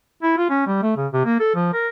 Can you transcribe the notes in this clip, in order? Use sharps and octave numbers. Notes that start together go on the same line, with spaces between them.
E4
F4
C#4
G3
A3
C#3
C3
A#3
A4
F3
A#4